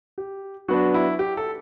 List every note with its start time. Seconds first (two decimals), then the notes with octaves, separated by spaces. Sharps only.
0.18 G4
0.68 F#3 B3 D4 F#4
0.94 E4
1.19 G4
1.37 A4